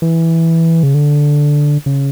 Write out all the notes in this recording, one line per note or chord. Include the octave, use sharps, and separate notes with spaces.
E3
C#3
D3
C#3